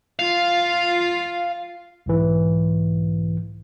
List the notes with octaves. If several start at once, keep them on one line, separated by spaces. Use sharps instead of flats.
F4 F5
B1 G#2 E3